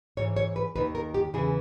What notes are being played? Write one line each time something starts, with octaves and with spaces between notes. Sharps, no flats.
G#2 E3 C#5
C#5
B4
D#2 D#3 B4
A#4
G4
E2 C#3 E3 G#4